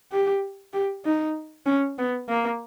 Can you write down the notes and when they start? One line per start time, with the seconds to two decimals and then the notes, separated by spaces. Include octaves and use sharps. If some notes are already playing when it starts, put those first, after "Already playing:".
0.12 G4
0.73 G4
1.05 D#4
1.66 C#4
1.98 B3
2.29 A#3